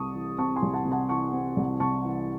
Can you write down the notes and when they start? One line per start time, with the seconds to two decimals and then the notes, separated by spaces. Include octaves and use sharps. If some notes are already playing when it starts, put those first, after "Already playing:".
Already playing: C2 C3 A5 C#6 D#6
0.14 E3
0.38 C4 A5 C#6
0.56 G#5 C6
0.62 C2
0.73 F#5 A5
0.85 C3
0.91 F#5 A5
1.09 E3 A5 C#6
1.33 C4
1.57 C2
1.80 C3 A5 C#6
2.04 E3